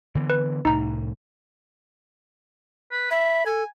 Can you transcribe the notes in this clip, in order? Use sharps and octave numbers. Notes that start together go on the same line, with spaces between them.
D3 E3 B3
B4
C2 A2 D#4 A#5
B4
E5 B5
A4 G#5